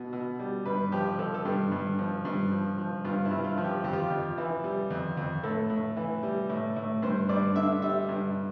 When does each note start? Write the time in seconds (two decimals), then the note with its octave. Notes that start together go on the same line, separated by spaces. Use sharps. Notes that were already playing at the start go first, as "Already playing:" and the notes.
Already playing: B2
0.13 B2
0.39 G3
0.66 G2 B4
0.92 F3 G4
1.19 F3 A4
1.34 A4
1.45 G2 G4
1.72 G2
1.99 F3
2.25 G2
2.52 F3
2.78 F3
3.05 G2 F4
3.25 E4
3.31 G2
3.44 F4
3.58 F3
3.64 G4
3.84 F2 G4
3.93 F4
4.03 G4
4.11 F2
4.38 E3
4.64 G3
4.90 F2
5.17 F2
5.43 A2 A4
5.70 A2
5.97 E3
6.23 G3
6.50 A2
6.76 A2
7.02 G2 C5
7.29 G2 D5
7.56 D3 E5
7.82 G3 E5
8.09 G2